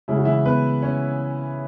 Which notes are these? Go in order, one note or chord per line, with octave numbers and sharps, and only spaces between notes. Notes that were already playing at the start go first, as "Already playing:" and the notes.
C#3 G#3 E4
F#4
E3 E4
B3 B4
C#4 C#5